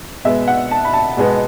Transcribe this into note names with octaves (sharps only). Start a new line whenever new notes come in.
B2 G#3 B3 E5
F#5
A5
B5
A5
B2 G#3 B3